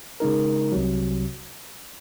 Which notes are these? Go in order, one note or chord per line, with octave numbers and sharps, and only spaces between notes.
C#3 G#3 D#4 A#4
C2 C3 F#3